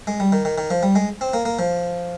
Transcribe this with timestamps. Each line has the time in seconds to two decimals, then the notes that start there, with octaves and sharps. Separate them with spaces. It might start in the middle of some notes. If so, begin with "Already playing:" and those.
0.07 G#3
0.20 G3
0.32 D#3
0.45 D#3
0.58 D#3
0.70 F3
0.83 G3
0.95 G#3
1.21 C4
1.33 A#3
1.45 A#3
1.59 F3